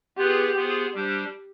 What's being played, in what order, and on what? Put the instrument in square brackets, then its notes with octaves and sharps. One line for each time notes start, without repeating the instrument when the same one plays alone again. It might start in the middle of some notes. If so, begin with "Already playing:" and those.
[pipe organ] B3 F4 G#4 B4 [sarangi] G4
[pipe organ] B3 F4 G#4 C5
G3 D4 G4 C5